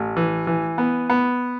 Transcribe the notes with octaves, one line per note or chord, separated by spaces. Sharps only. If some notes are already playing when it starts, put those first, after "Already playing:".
Already playing: A1
E3
E3
B3
B3